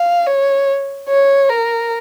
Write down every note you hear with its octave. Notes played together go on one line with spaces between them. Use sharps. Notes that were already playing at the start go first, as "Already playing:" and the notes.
Already playing: F5
C#5
C#5
A#4